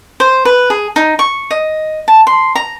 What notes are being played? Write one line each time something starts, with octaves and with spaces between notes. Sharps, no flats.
C5
B4
G#4
D#4
C#6
D#5
A5
C6
A#5